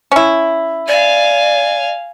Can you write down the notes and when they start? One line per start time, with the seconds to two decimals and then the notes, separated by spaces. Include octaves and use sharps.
0.12 C#4 E4
0.88 D5 F5 G#5